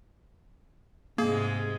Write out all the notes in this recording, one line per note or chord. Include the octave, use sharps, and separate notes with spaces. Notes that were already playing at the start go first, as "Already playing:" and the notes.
G#2 C3 G#3 A#3 G#4